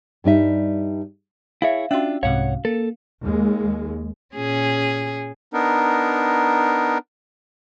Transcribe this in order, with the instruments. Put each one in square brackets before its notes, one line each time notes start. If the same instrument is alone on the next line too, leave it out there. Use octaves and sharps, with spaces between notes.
[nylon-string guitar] G2 G3 D#4 E5
[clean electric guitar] E4 G#4 C#5 [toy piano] E5 F5
[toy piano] C#4 F#4 [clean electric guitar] D4 F4 [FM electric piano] E5
[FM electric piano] C2 G#2 C3 [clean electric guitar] C#5 F#5 [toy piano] F5
[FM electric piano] A#3 [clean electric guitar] A4
[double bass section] D#2 G#3
[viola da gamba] A#2 C#4 G#4
[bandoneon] B3 D4 D#4 A#4